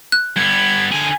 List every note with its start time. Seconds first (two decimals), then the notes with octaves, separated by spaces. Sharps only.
0.12 F#6
0.36 G2 B3 G#6
0.92 D3 G#4 G#5